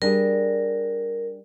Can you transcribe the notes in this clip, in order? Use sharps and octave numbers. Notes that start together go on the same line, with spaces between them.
G3 D4 G#4 A#4